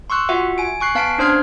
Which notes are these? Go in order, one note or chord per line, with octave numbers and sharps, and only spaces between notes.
C6 C#6 E6 F#6
F4 F#4 E5 F#5
G#5 D7
G#5 C#6 F#6 C7
B3 F5 A5 B6 C7 D7
C#4 D4 C5 C6 F6 G#6